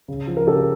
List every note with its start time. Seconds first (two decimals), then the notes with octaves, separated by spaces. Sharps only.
0.08 C#3
0.27 F3
0.37 A#4
0.47 C#3 G4 A4